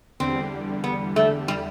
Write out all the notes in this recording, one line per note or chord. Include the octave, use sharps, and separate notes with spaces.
E2 D3 G3 C4
B3
A3
G3